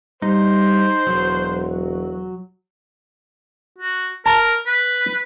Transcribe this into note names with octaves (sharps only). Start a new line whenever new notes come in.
G3 D#4 C5
E1 F#3
F#4
A#4 A5 A#5
B4